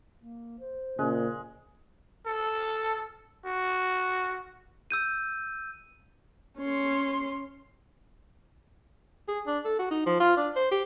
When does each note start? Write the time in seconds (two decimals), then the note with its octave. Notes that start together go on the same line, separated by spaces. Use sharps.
0.21 A#3
0.59 C5
0.99 A#2 C#3 G#3
2.26 A4
3.45 F#4
4.91 E6 G6 D#7
6.58 C#4 C6
9.28 G#4
9.46 D4
9.65 A4
9.79 F#4
9.91 D#4
10.06 F3
10.20 F4
10.37 D4
10.56 C5
10.71 G4